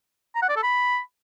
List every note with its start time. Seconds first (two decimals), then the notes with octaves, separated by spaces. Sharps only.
0.35 A#5
0.42 F#5
0.49 D5
0.56 A4
0.63 B5